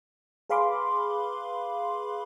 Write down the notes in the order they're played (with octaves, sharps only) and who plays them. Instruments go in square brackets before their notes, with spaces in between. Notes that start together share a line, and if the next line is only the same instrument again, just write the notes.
[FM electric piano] G#4 B4 F5 B5 C6 D6